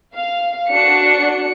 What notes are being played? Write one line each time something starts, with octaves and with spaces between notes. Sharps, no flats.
F5
D4 F#4 C#7